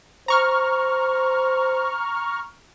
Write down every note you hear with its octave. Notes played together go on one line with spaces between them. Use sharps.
C5 A#5 C#6 F6